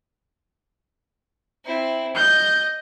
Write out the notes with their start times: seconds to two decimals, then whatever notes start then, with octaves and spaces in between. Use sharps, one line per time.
1.65 C4 E4
2.15 D#5 G6